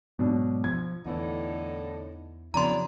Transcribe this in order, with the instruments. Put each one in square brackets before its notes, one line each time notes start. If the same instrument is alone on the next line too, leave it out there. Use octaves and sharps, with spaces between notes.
[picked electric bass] G#2 F#3 [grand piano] B2 D4
[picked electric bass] F3 [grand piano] G#6
[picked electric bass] E2 E3 [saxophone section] A2 D3 D#4
[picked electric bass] F2 C#3 F#3 [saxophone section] B3 D4 E4 [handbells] A#5 C6